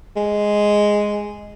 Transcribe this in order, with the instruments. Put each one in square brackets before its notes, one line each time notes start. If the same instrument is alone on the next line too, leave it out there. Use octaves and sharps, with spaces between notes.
[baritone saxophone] G#3